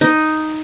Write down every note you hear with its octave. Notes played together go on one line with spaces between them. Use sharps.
D#4